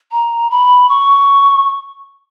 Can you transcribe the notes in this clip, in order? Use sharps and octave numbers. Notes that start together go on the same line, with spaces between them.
A#5
B5
C#6